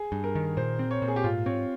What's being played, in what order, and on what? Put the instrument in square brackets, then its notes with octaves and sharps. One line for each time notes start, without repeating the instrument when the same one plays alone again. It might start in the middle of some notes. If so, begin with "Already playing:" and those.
Already playing: [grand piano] G#4
[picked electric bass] G2
[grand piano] A#4
[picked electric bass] D#3
[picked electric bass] A#2 [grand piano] C5
[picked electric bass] C4
[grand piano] C#5
[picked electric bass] A#2
[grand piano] G#4
G4
[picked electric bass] G#2 [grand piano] F4
[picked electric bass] C4 [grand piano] C#5